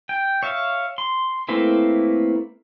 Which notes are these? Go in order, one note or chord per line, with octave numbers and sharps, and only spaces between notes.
G5
C#5 E5 F5
C6
A3 A#3 C4 E4 B4